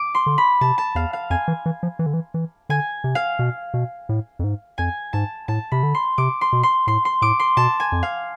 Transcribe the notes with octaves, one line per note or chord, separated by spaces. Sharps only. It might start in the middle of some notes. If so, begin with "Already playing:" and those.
Already playing: D6
C6
D3
B5
C3 A5
A5
E2 F5
F5
F2 G#5
E3
E3
F3
E3
D3
E3
E3
D3 G#5
C3
F5
B2
B2
A2
F2
G#2
F2 G#5
G#2 A5
A2 A5
C3 B5
D3
C6
C3 D6
C6
B2
C6
A2 C6
C6
A2 D6
C6
B2 A5
G#5
F2
F5